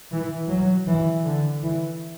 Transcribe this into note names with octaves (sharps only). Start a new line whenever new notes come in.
E3
F#3
E3
D3
E3